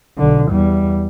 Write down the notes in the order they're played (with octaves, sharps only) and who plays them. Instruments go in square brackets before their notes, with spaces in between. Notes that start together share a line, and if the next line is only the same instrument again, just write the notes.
[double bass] B1 D3
E2 G3